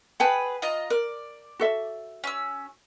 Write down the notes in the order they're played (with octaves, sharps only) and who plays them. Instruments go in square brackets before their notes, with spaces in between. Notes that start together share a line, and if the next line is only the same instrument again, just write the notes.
[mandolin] G#4 B4 [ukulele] F#5 G5 A5
[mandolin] F4 D#5 A#5
[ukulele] A#4 [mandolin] D5
[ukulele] F#4 A4 E5
[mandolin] C#4 E6